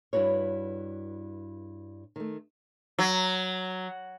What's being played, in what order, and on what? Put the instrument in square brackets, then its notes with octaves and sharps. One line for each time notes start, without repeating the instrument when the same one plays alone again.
[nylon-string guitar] G2 E4 F#4 B4 C#5
D#3 A3
[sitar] F#3